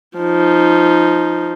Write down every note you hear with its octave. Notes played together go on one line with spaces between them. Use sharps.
F3 D#4